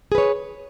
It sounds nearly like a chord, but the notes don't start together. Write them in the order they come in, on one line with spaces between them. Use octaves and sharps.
G#4 B4 C#5